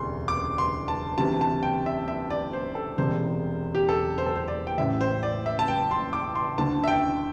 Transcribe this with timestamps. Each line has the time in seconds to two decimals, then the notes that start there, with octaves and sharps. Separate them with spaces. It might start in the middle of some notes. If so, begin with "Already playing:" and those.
Already playing: E1 D2 C3 C6
0.28 D6
0.58 C6
0.88 A5
1.18 D2 C3 E3 A5
1.41 A5
1.63 G5
1.86 E5
2.08 E5
2.30 D5
2.53 C5
2.75 A4
2.98 E1 E2 C3 C5
3.75 G4
3.89 A4
4.18 C5
4.26 A4
4.36 C5
4.48 D5
4.67 G5
4.78 A1 A2 E3 E5
5.01 C5
5.23 D5
5.46 E5
5.59 A5
5.68 G5
5.91 C6
6.13 D6
6.35 C6
6.58 D2 D3 A5
6.84 E5
6.88 G5